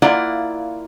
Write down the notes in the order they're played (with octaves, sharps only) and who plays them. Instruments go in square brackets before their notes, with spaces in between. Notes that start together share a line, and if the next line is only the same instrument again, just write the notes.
[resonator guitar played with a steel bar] A#3 E4 F4 D5 F#5